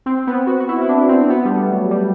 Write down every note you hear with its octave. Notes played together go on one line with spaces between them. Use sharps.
C4
B3
F#4
F#4
E4
E4
D4
C4
B3
G3
A3
F#3
G3